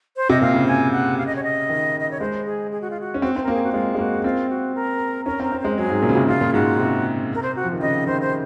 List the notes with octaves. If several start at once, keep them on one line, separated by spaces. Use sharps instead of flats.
C5
C3 D#5
A#2 F5
C#3
G#5
F#5
F5
D#5
C#5
D#5
D#3
D#5
C#5
G#3 C5
G#4
G#4
F#4
F4
F#4
C#4
C4 F#4
C4 C5
A#3 A#4
G#4
F#4
G#3 F4
G#3
A#3 F#4
C4 F4
F#4
A#4
C#4 A#4
C4
A#4
C4
G#3 C5
F#3 G#4
G#2
A#2
C#3
C3
C#3 F4
A#2
G#2 F#4
C3
A#4
C5
F#4
F3
D#3
C#3 D#5
D#3 C5
C5